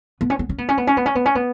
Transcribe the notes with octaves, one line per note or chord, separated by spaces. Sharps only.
B3
C#4
B3
C#4
B3
C#4
B3
C#4
B3
C#4
B3
C#4
B3